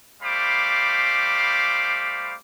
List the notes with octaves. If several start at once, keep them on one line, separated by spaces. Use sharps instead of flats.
G3 A3 C5 F5 B5 D6